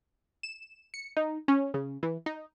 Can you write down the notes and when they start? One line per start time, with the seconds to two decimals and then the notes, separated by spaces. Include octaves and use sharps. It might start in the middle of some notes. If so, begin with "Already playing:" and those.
0.43 E7
0.94 C#7
1.17 D#4
1.48 C#4
1.74 C#3
2.03 E3
2.26 D#4